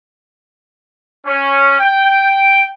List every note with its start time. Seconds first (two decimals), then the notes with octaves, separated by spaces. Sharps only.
1.26 C#4
1.79 G5